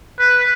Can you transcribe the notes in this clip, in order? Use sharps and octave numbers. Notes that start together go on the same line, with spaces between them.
B4